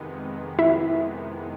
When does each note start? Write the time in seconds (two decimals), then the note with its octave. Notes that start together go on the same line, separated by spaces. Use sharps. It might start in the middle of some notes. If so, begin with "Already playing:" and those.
Already playing: F2 C3 D#3 G#3 B3
0.59 E4 E5